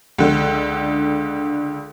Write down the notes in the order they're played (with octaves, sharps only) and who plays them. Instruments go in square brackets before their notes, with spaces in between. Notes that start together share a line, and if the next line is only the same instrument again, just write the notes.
[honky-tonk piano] C#2 D3